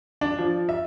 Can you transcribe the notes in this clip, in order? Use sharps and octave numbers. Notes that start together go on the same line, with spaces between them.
D4
F3
E5